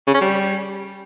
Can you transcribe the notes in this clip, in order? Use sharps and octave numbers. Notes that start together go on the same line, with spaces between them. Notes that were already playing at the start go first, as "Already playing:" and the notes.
C#3
C#4
G3